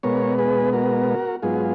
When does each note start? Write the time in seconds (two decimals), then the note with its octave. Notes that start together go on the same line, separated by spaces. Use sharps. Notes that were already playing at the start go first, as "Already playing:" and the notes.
0.03 B2 G#3 B3 A#4 C#5
0.38 G#4 B4
0.73 F#4 A#4
1.42 G#2 F#3 B3 F4 G#4